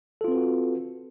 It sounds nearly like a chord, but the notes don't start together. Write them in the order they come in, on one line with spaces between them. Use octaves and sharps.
A4 F4 C4 B4 F#4